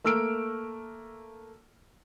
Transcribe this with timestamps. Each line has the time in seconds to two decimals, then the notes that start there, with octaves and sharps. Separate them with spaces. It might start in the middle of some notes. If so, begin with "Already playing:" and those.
0.04 A3 A#3 E6 F6 D7